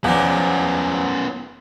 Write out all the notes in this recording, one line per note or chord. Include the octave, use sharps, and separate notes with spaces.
E2 F3 B3 C#4 D4